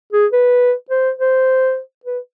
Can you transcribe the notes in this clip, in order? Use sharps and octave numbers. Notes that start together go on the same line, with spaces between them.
G#4
B4
C5
C5
B4